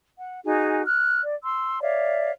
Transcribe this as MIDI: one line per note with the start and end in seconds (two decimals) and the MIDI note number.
0.17 0.39 78
0.44 0.82 63
0.44 0.82 66
0.44 0.82 68
0.44 0.82 80
0.86 1.20 89
0.86 1.20 90
1.22 1.36 74
1.43 1.79 84
1.43 1.79 88
1.81 2.32 73
1.81 2.32 74
1.81 2.32 76
1.81 2.32 77